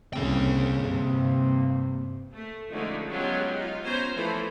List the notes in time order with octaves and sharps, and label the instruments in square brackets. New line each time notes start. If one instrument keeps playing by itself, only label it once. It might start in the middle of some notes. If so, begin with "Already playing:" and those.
[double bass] C2 C#3 [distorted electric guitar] A#3 G5
[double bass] G2 C3
[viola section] A3
D3 F3 G#3 A3 C#4 D#4
F#3 G#3 B3 C#4 F4 G4
D#4 F4
B3 C#4 C5 G#5 A#5
E3 F3 A3 A4 C5